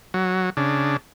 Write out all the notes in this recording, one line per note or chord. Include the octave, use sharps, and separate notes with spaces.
F#3
C#3 D4